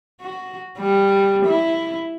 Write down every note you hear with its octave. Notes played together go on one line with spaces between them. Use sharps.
F#4
G3
E4